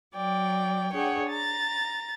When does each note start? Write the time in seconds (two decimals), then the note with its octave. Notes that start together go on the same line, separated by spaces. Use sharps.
0.14 F#3 D5 G5
0.93 D4 G#4 C#5 F#5 G5
1.29 A#5 A6